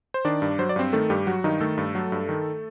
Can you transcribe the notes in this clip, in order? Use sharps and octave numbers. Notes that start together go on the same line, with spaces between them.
C5
D#3 D4 D5
G2
F#3 C5
D5
G2 C4 C5
D#3 A3 A4
G2 G3 G4
F#3 F#4
G2 D#3 D#4
D#3 A3 A4
G2
F#3
G2
D#3